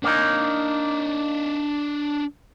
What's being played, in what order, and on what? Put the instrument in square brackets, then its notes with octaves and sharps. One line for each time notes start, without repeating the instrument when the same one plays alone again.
[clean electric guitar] A#3 D#4 [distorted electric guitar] D4 C#5